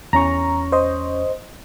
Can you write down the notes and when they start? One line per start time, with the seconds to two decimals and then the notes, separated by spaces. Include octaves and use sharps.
0.13 E2 C#4 A#5 C#6
0.72 C5 D#5